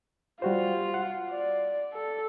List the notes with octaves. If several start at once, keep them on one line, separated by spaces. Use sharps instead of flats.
G3 F4 F#4 C5
F#5
D5
A4